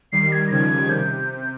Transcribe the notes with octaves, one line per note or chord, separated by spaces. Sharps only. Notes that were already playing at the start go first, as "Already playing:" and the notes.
D#3 G3 C7
G#6
A#6
C#3 F3 G#6
C3 G6